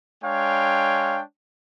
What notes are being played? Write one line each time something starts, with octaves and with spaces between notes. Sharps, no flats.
G#3 D4 C#5 F5 G5